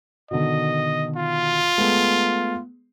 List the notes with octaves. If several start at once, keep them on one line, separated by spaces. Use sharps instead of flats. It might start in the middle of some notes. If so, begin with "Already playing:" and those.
B2 D3 D#3 D#5
F4
G#3 A3 B3